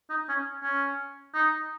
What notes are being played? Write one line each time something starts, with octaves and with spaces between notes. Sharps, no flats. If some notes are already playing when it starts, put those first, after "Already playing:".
D#4
C#4
C#4
D#4